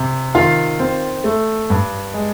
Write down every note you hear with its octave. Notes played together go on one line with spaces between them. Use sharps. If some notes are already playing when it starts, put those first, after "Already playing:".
Already playing: C3
D#3 F4 F5
C4
A3
G2
G#3